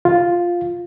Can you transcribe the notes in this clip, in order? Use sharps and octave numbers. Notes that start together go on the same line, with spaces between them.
F4